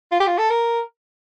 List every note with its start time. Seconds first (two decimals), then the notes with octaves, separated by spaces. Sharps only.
0.12 F4
0.20 G4
0.27 F4
0.38 A4
0.50 A#4